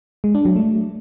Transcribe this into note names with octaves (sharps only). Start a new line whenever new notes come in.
G#3
D4
F#3
A3